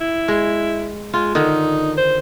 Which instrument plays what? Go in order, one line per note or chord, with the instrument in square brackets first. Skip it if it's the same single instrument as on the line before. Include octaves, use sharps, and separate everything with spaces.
[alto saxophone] E4
[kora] G#3
[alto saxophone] G#3 [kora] F4
[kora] D3 D#3 [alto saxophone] D#4
[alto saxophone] C5